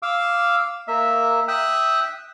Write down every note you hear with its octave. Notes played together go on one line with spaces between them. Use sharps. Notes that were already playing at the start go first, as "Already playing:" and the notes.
F5 D6 E6
A#3 E5
E5 G5 D#6 F#6